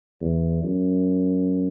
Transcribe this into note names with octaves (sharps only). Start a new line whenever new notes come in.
E2
F#2